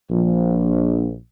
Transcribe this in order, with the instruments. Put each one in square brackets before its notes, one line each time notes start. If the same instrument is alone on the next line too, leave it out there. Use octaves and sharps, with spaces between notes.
[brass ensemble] A#1